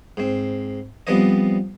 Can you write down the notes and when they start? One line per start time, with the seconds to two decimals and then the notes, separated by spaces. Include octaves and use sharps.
0.17 G#2 C4
1.07 F3 G3 B3 C4 D4 D#5